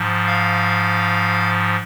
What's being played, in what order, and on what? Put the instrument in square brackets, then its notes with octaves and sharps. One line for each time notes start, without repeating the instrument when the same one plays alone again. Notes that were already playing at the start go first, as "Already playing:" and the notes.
Already playing: [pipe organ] G#2 F3
F5